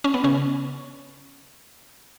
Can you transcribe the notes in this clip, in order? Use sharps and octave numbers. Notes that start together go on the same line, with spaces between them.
C#4
B3
C#3 C#4